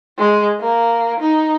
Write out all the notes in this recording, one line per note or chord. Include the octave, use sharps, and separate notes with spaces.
G#3
A#3
D#4